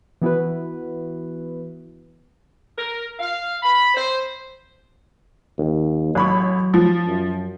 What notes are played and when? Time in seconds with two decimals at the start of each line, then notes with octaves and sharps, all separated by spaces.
0.22 E3 B3 E4 F#4 B4
2.77 A#4
3.20 F5
3.63 B5
3.95 C5
5.58 D#2
6.15 A1 F#3 B5 C#6
6.74 F3
7.07 F#2